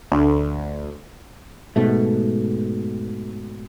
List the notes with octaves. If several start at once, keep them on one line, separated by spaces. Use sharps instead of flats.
D2
G#2 B2 A3